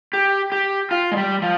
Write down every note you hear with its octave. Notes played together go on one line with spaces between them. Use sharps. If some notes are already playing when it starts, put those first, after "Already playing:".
G4
G4
F4
G#3
G3
F3